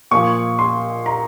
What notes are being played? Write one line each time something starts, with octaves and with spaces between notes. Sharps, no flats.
A#2 F3 C#6
C6
A#5